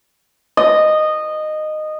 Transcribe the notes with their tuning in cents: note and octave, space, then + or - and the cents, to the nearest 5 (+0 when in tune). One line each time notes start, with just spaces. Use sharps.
D#5 -15